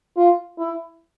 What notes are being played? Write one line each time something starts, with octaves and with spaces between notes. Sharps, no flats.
F4
E4